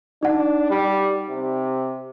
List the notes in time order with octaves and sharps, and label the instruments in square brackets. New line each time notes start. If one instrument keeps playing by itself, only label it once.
[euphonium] D4 [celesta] D#4 F#5
[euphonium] G3
C3